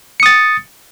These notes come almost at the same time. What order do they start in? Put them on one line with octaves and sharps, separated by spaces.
C#7 D#6 A6